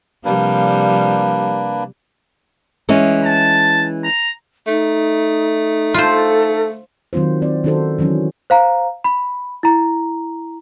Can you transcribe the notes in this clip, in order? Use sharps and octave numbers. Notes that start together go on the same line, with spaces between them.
C3 F3 G3 A#3 D4 B4
E3 G#3 C#4
A5
A#5
A3 D#4
F4 A4 C5
D#3 F#3 C4 F4 C5
C4 D5
D#3 C#4 D#4 F#4 A4 C5
D#3 E3 F#3 C#4
C5 F5 A#5
B5
E4 A#5